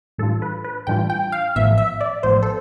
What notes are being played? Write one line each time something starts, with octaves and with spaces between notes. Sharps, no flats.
A2 E3 G3 D4 F4 A4
B4
B4
A2 E3 G3 D4 F4 G5
G5
F5
A1 A2 F3 B3 E5
E5
D5
A1 A2 F3 B3 C5
A4